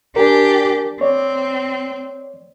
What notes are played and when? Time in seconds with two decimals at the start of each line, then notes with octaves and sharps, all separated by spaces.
0.16 D4 G4 A#4 G#5
1.01 C4 C#5 D5